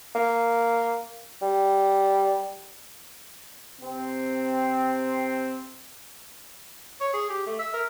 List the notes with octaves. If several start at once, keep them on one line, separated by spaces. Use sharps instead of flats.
A#3
G3
C3 C4
C#5
G#4
G4
A3
E5
A#4